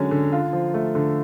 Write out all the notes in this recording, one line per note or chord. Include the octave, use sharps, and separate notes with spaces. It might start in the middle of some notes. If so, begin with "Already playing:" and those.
Already playing: D3 F#3 G#3 C#4
D3
F4
F3
A3
D3